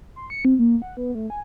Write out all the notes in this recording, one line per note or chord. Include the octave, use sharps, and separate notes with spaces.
C6
C#7
C4
A#3
F#5
B3
A3
G#5